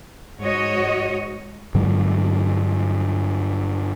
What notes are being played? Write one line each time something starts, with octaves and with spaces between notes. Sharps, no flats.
G#2 F#4 C#5 D#5
G2 D3 F#3 G#3